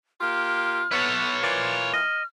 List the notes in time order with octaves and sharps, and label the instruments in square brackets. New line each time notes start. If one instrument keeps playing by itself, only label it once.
[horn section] A#3 F4 G4 [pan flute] F6
[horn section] B3 [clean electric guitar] E4 A4 [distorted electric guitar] B4 C#5
[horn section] E3 A#3 F4 [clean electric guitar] C5 D5
[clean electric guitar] D#5 [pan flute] F6